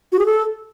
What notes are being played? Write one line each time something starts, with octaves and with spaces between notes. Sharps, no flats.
F#4
G#4
A4